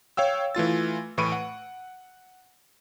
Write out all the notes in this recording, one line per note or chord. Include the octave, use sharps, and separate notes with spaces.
C#5 F5 G5 E6
E3 A3 F4 A6
A2 E3 B5 C#6 D7 D#7
F#5